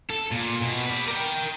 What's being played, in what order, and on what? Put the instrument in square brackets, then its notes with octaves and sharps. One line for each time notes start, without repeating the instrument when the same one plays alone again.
[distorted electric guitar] A4
A#2
B2
B4 D5
A#4 G5